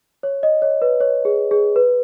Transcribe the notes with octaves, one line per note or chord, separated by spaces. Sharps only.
C#5
D#5
C#5
B4
C#5
G#4
G#4
B4